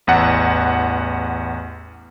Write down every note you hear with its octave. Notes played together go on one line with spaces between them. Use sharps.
A1 E2 F#5